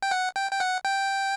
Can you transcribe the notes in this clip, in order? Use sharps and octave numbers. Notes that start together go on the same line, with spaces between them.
G5
F#5
G5
G5
F#5
G5